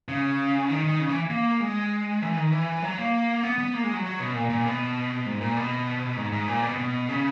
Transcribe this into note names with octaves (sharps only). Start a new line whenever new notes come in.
C#3
D#3
D#3
C#3
E3
A#3
G#3
E3
D#3
E3
F#3
A#3
B3
B3
A#3
G#3
F#3
F#3
B2
A#2
A#2
B2
G#2
A#2
B2
G#2
G#2
A#2
B2
B2
C#3